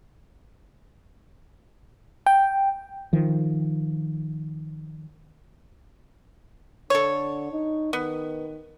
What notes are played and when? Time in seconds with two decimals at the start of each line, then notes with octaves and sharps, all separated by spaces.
2.26 G5
3.13 D#3 F3
6.90 D3 A4 C#5
7.52 D#4
7.93 D#3 B3